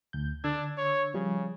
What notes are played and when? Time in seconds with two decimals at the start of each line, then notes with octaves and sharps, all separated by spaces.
0.13 D2 G6
0.44 D3 D4 E6 G#6
0.78 C#5
1.14 C#3 F3 G3